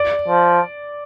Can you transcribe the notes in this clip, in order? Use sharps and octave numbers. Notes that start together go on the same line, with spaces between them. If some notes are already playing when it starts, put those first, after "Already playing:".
Already playing: D5
F3